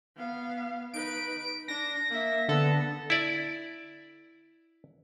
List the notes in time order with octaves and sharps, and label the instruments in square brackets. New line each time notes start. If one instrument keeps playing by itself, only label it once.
[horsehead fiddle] B3 F5
[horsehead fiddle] D#4 B4 [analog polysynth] D7
[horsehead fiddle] D4 [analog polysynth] A#6
[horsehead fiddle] A#3 E5
[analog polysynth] D3 A4 [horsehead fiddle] B3
[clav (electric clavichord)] E4 D5